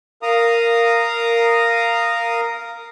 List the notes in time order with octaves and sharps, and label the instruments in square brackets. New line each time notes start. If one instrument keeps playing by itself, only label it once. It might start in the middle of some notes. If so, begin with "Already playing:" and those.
[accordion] A#4 F5 A#5 D#6